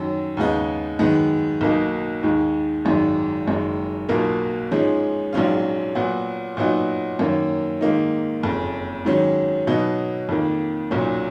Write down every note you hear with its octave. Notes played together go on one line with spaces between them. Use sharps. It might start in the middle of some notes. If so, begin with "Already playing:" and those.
Already playing: F#2 D#3 F#3 C#4
D#2 C#3 G#3 B3 D#4
F#2 D#3 G#3 B3
B1 B2 A#3 D#4
D#2 D#3 G#3
G#1 F#2 D#3 G#3
F#1 F#2 D#3 G#3
B1 B2 A#3 F4 A#4
G#2 F3 G#3 C#4
A#1 G#2 F#3 C#4 F4
A#2 F#3 B3 F#4
A#2 F#3 B3 D#4 F#4
F#2 D#3 A#3 C#4
G#2 D#3 A#3 D#4
F#1 F2 C#3
G#2 D#3 F#3 C#4
B2 F#3 B3 D#4
F2 D#3 A#3
B1 A#2 F#3 C#4